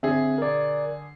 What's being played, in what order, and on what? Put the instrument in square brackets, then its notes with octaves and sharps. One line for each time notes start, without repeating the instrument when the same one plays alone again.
[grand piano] D3 G#4 [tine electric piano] C4 E5
[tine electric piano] A#4 D5